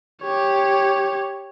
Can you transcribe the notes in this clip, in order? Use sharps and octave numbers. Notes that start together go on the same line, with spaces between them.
G4 C#5